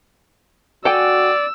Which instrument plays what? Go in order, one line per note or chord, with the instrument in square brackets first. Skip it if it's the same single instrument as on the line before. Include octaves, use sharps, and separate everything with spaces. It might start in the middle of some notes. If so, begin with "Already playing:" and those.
[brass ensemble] F#4 [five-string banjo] A4 G5 G#5 [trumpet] D5 [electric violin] E6